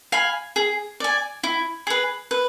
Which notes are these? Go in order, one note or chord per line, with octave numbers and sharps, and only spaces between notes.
F5 G#5 B5
G#4
D5 G#5
E4
G#4 B4
B4